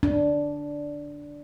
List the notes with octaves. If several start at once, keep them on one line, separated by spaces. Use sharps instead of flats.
D4